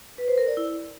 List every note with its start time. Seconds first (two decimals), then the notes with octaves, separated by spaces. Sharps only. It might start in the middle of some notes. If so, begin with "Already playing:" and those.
0.18 B4
0.28 C5
0.38 A#4
0.47 D5
0.57 E4